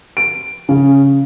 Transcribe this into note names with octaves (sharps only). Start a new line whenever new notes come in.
D7
C#3